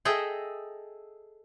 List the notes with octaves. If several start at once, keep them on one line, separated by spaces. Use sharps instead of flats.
G#4 A4 D#5 E5 G5 A#5